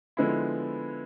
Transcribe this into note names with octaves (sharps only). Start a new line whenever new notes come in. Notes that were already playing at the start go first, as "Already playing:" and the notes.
D3 F3 G#3 B3 E4